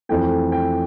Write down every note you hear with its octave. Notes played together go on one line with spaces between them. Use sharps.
F2 E3 A3 G5
G5